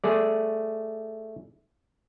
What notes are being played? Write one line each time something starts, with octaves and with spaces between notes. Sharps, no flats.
A3 G#4 D5